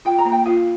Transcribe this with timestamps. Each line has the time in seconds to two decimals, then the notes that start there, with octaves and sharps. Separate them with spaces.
0.05 F4 G5
0.19 A#5
0.25 A#3
0.32 G5
0.46 F4 F5